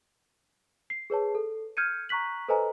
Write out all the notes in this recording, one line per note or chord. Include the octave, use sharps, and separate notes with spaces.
C7
G#4 B4 C#5 A5
A4
F6 G6 G#6 C#7 D#7
A#5 C#6 F#6 B6 F#7
A4 B4 C5 D#5 G#5 A#5